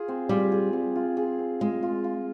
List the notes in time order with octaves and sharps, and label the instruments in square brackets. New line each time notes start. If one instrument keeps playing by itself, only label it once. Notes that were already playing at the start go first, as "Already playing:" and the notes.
Already playing: [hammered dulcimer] F4 G#4
C4
[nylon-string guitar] G3 [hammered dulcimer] F4
[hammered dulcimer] G#4
C4
F4
G#4
C4
[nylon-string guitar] G#3 [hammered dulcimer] F4
[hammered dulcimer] F4
F4